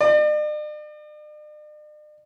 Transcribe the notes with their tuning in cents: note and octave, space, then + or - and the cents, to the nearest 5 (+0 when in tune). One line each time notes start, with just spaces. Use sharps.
D5 +45